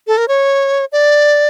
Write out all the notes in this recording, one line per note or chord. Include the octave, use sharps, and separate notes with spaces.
A4
A#4
C#5
D5